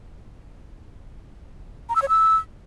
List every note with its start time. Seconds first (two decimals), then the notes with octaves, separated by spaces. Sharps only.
1.89 A#5
1.96 E6
2.02 C#5
2.09 E6